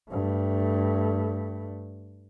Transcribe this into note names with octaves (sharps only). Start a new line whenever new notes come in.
G2 A3